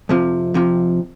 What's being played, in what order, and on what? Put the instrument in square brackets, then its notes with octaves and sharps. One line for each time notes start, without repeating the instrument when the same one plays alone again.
[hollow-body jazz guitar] F2 C3 F3
F2 C3 F3